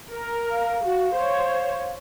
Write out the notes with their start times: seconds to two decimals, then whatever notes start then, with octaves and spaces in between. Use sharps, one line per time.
0.10 A#4
0.51 F5
0.84 F#4
1.15 C5 C#5